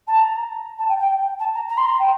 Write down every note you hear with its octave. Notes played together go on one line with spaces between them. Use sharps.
A5
A#5
A5
G5
G5
A5
A#5
A#5
C6
A#5
G5